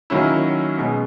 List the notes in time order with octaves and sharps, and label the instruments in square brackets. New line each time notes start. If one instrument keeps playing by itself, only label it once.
[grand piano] D#3 F#3 A#3 C#4 E4
B2 G#3 C#4